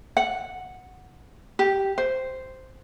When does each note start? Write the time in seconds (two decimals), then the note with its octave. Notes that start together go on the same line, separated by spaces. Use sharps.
0.17 F#5
1.59 G4
1.98 C5